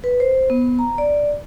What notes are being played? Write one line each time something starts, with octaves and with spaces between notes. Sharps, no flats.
B4
C5
B3
A#5
D5